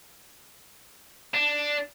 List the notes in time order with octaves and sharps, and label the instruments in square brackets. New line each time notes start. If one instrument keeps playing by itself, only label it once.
[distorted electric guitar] D4